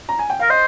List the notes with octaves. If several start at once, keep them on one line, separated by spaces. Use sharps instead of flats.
A#5
G#5
G5
A#4 F5
C5 D#5